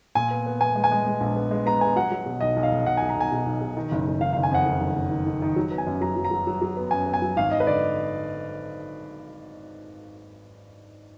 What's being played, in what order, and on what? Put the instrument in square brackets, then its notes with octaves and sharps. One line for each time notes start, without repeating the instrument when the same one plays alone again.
[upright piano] A#2 G#5
B3
B3
B3 G#5
G#3
G#5
G#3
G#3
A#1
B3
G#3
B3 A#5
B3 G#5
F#3 F#5
F#3
B2
B1 D#5
B1
F5
B1
B1 F#5
B1 G#5
A#5
B1 G#5
B2
B1
B2
D#3
F#1
F#1
D#3 F5
F#1 F5
G#5
F2 F#5
D#3
F#1
F#1
D#3
D#3
D#3
F#3
B3
G#5
F#2
F#3 A#5
F#3
A#5
F#3
F#3
F#3
B3
F#2 G#5
B3
G#5
F#3
G#1 F5
G#1 D#5
B4
D3 D5